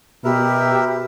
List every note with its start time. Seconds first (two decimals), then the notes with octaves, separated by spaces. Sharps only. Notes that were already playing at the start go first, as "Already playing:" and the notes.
0.24 B2 G4 A#4 B4 E5